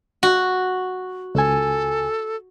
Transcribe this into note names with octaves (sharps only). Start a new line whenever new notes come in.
F#4
C#2 A4 G#5